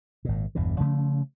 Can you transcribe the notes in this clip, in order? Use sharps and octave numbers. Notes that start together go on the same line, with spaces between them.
G#1 A#2
G1 E2 B2 D3
C#3 F3 A3 C#4